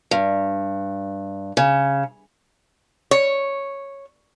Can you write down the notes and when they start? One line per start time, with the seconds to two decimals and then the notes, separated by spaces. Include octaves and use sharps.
0.11 G2
1.57 C#3
3.11 C#5